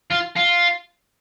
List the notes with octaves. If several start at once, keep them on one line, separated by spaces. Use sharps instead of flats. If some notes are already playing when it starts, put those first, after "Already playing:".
F4
F4